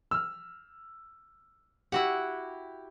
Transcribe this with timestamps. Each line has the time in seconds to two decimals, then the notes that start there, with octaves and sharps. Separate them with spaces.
0.11 E6 F6
1.92 E4 F#4 G4 F#5